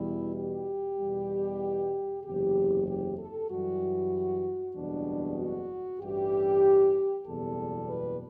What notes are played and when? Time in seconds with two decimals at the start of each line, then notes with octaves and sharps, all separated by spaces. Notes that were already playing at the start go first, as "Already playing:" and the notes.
Already playing: E2 B2 G3 E4
0.35 G4
0.98 E2 B2 G3
2.24 F#1 E2 C3 G4
2.86 G4
3.17 A4
3.49 F#2 E3 G3 F#4
4.75 F#1 E2 B2 G3 D4
5.38 F#4
6.00 A1 G2 E3 G3 G4
7.26 F#1 E2 B2 G3 A4
7.89 B4